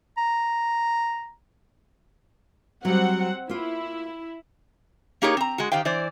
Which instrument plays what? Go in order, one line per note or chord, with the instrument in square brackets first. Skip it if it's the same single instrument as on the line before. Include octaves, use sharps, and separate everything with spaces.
[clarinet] A#5
[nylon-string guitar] F#3 G3 [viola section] C4 F#5
[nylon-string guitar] A#3 F4 [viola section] E4
[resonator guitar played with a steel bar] A#3 D#4 G4 G#4 A#4 C#5
C4 A#5
G#3 F#4
D#3 G4 C5 F5 G5
E3 C5 D5